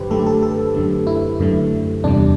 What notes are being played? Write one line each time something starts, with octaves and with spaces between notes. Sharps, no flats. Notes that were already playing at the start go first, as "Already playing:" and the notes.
Already playing: F#2 D3 G4 B4 C5
F#2 D3 A3 A4
G4
A4
A4
F#2 D3 A3
E4
F#2 D3 A3
E2 C3 G3 D4